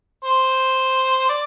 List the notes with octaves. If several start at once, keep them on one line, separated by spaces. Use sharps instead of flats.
C5
D5